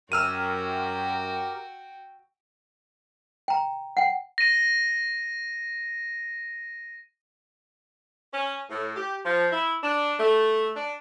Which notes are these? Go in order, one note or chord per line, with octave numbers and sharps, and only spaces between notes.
F#2 F#4 G4 A#4 G5 E6 F6 D#7
G5 A#5
F#5 G5
A#6 D#7
C#4
A2
G4
F3
E4
D4
A3
D4